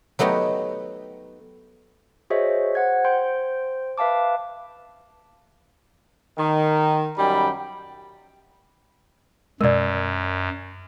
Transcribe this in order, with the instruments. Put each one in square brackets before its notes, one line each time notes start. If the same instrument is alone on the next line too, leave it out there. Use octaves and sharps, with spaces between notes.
[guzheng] F#3 A3 B3 D#4 G4
[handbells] F#4 G#4 C5 C#5 D#5 E5
C5 F#5 G#6
C5 G5 C6 G6
B4 E5 F5 A5 D6
[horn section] D#3
F#2 D#3 G3 G5 B5
[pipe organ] F#2 [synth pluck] B2 G#3 [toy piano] A#4 D5